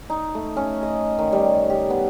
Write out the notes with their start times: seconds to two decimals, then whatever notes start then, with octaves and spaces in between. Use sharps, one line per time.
0.10 D#4
0.35 A3
0.56 C#4
0.83 D#5
1.19 D#3
1.32 G3
1.70 G4
1.90 B3